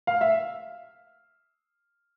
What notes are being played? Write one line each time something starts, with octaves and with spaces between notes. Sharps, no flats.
F5
E5